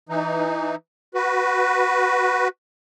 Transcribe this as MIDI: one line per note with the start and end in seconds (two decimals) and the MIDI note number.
0.09 0.75 52
0.09 0.75 63
1.14 2.48 66
1.14 2.48 71